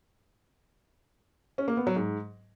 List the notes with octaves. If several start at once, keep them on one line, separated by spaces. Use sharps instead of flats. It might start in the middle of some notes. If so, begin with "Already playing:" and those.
C#4
A#3
B3
F#3
G#2